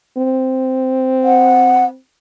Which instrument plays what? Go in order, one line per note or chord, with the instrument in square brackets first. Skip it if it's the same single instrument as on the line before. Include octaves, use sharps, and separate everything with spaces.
[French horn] C4
[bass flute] F#5